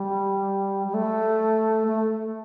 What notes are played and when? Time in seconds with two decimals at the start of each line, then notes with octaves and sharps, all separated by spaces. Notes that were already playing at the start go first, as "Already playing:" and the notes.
Already playing: G3
0.88 G3
0.94 A3
1.87 A3